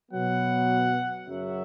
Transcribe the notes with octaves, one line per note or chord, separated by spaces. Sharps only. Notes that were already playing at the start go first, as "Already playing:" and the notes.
B2 F#3 B3 F#5
F#2 C#3 F#3 E5